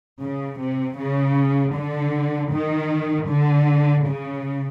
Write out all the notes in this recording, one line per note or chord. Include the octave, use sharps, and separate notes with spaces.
C#3
C3
C#3
D3
D#3
D3
C#3